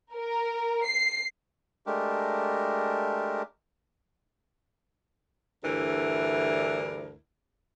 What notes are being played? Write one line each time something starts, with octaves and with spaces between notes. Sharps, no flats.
A#4
C7
G#3 A3 D4 G4 A#4
D2 G2 D3 E3 E4 A#4